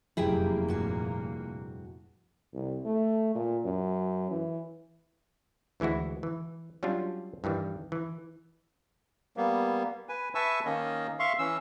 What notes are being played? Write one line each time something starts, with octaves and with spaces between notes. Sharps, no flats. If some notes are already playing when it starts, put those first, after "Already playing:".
F1 F#2 A#2 A#3 E4 G4 G#4 G5
G2 F#4 G#5
C2
A3
A#2
F#2
E3
D2 E3 G#3 E4 F#4
E3
F#3 G3 C#4 D4 F4
G2 D#3 E3 G3
E3
G3 A#3 B3
B4 G#5
B4 E5 G#5 A5 C#6 E6
D#3 A#3 C#4 D#5
E5 F5 C6 C#6
E3 C#4 E6